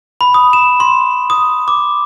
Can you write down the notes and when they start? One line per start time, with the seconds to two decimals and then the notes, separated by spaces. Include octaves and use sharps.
0.21 B5
0.34 D#6
0.53 E7
0.80 C6
1.30 D#6
1.68 D6